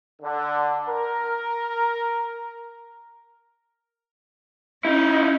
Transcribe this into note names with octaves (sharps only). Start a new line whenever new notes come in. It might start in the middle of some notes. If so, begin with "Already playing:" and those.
D3
A#4
C#4 D#4 E4